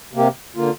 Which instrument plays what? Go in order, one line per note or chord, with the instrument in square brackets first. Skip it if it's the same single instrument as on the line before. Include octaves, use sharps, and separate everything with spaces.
[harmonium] C3 A#3 G4
D3 A#3 F4